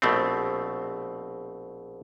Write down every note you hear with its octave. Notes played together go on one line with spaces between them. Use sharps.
A#1 B2 A3 C4